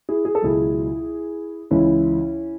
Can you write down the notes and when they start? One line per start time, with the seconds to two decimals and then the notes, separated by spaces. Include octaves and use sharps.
0.09 E4 G#4
0.25 G#4
0.35 A4
0.41 C#2 B2 F#3 E4 G#4
1.71 C#2 C#3 E3 C#4 E4